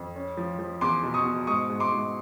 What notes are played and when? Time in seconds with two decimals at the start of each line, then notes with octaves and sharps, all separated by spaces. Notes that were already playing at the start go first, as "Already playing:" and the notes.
Already playing: F2
0.16 C#4
0.37 F3
0.59 F3
0.81 E2 C6 D6
1.03 B2
1.14 C#6 D#6
1.25 B2
1.47 G#2 C#6 D#6
1.70 G#2
1.80 C6 D6
1.92 G#2